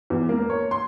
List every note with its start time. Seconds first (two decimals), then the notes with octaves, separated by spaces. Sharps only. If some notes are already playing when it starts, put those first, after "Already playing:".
0.10 E2
0.29 A#3
0.50 C#5
0.71 C6